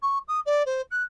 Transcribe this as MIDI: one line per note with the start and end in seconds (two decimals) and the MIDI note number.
0.02 0.18 85
0.28 0.40 87
0.45 0.63 74
0.66 0.81 72
0.91 1.03 90